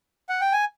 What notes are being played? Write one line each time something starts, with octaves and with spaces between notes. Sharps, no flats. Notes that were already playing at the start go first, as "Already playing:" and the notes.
F#5
G5
G#5